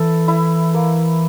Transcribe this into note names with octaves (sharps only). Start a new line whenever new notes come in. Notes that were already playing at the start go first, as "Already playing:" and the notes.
Already playing: E3 E4 A4
E4
A#3